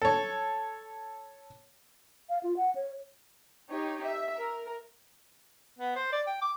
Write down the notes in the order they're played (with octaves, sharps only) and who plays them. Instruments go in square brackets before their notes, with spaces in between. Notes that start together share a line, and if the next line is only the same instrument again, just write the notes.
[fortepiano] A4 C#5
[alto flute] F5
F4
F#5
C#5
[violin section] D#4 G4 C#5
E5
A#4
[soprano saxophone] B3
C5
D5
G5
D6